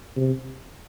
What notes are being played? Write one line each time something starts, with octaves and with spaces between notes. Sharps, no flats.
C3